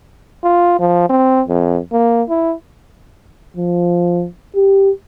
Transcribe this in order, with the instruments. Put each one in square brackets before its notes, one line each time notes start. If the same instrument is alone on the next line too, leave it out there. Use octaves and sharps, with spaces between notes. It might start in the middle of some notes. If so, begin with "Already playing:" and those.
[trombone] F4
F3
C4
F2
A#3
E4
[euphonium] F3
G4